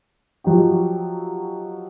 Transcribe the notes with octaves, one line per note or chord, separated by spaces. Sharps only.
F3 F#3 D#4 G4